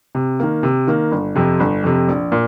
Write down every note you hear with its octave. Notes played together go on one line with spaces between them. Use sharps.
C3
D#3 A#3
C3
D#3 A#3
G1
F2 C3
G1
F2 C3
A#1
A#2